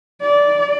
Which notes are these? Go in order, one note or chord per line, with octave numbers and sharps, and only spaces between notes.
D5